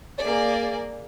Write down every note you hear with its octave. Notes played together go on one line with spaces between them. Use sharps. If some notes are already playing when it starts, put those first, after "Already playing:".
A#3 G#4 D5